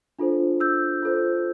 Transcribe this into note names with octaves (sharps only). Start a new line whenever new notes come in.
D4 F4 A4 C5
E6 G6
F4 A4 C5